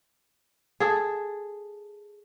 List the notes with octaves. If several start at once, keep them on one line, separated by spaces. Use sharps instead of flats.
G#4 A4